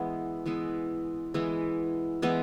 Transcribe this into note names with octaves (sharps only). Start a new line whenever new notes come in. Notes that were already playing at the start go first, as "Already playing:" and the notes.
Already playing: E3 G#3 B3 E4
E3 G#3 B3 E4
E3 G#3 B3 E4
E3 G#3 B3 E4